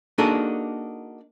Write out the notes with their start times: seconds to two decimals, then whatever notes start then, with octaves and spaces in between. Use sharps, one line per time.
0.18 A#3 D4 D#4 F#4 G#4 A4